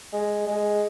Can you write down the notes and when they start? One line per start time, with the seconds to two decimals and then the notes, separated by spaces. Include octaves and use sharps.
0.13 G#3
0.47 G#3